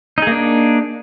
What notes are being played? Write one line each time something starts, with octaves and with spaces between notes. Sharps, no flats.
A#3 D4 D#4 G#4